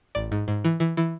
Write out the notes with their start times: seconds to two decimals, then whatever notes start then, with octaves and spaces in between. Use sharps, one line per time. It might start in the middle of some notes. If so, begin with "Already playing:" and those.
0.15 A1 D5
0.32 G#2
0.48 G#2
0.64 E3
0.80 E3
0.97 E3